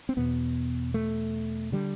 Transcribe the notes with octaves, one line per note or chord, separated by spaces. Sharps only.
C4
E2 B2 B3
A3
D3 G3